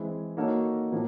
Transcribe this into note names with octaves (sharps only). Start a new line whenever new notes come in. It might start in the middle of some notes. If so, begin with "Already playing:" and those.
Already playing: E3 G#3 C4 E4
A#3 D#4 F#4 A4 C#5
A2 F3 A#3